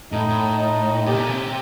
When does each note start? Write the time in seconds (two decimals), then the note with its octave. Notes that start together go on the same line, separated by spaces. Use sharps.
0.12 A2 D#4
0.28 A2
0.60 D#4
1.06 A#2 G4
1.14 C3
1.20 A#2
1.30 C3